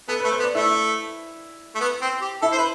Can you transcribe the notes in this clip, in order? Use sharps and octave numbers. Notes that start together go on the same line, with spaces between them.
B3 A4
A3 B4
C5
B3
D5
A3 E4 E5
A3
B3
C4
G4
E4 A4 E5
C5
B4